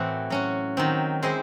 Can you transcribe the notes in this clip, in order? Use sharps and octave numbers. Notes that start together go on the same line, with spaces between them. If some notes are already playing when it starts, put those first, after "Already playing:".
Already playing: A2 E3 A3 C4 F#4
F#3 C#4 F#4
D#3 F#3 C4
G#3 C4 E4 C5 D#5